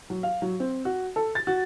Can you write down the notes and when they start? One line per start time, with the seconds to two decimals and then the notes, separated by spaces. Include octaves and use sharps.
0.10 F#3
0.23 F5
0.42 F#3
0.60 C4
0.85 F#4
1.16 A4
1.35 A6
1.47 F#4